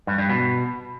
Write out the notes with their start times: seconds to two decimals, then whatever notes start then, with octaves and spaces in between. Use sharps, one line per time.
0.07 G2
0.18 G2
0.29 B2